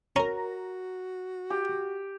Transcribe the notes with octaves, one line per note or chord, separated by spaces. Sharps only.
C#4 F#4 A#4 A#5
G4